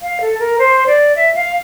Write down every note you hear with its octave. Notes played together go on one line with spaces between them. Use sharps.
F5
A4
A#4
C5
D5
E5
F5